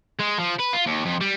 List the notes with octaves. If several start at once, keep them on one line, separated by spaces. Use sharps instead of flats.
G#3
F3
B4
F4
D#2
F2
G3